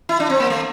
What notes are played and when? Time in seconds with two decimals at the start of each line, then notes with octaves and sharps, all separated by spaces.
0.09 E4
0.20 D4
0.30 C4
0.40 A#3
0.50 A3